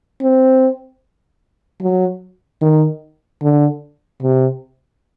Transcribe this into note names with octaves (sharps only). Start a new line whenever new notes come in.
C4
F#3
D#3
D3
C3